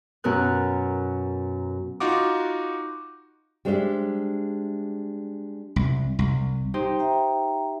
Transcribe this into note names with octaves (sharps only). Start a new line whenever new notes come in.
F#2 B2 A#4 F#6
D#4 F4 F#4 D6
G3 G#3 D4 C5 C#5 E5
C2
C2
D#4 G4 C5
E5 G5 A#5